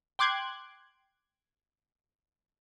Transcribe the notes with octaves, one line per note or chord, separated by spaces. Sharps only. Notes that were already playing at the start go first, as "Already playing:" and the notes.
G5 C6 D6 F#6 G#6